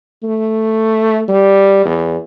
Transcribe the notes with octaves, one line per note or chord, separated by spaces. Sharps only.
A3
G3
E2